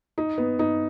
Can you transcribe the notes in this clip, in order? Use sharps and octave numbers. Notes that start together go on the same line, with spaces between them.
D#4
B3
D#4